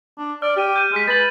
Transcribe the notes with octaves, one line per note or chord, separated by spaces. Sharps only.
D4
D5 F6
G4 F6 D#7
G6 D#7
G#3 F6 B6
B4 A6 F#7